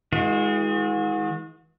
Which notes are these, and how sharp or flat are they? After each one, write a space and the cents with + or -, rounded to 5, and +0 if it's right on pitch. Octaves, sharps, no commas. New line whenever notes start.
E3 -45 G#3 +0 F#4 -40